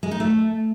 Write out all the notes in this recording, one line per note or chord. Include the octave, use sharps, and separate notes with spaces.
G#3
D#4
A3